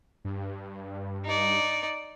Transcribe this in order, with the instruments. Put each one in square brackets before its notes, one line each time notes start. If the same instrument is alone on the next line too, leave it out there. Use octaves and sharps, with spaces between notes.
[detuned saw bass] G2
[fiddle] D#4 D5